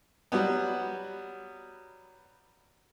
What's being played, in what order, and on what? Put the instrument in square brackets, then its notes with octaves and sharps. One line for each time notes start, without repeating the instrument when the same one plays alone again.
[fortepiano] F#3 G3 B3